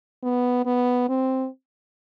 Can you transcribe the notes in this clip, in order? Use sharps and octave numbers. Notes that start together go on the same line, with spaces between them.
B3
B3
C4